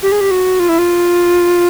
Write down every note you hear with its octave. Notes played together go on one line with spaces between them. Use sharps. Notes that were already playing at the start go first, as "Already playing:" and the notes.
G4
G#4
G4
F#4
F4
E4
F4